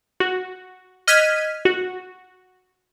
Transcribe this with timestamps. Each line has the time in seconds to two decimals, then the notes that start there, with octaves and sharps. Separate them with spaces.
0.20 F#4
1.07 D#5 F6 F#6 G#6 B6 D#7
1.65 F#4